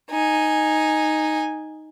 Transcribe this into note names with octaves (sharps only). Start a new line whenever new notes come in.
D#4 G#5